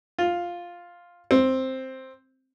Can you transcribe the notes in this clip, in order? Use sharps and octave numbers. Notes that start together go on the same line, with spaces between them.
F4
C4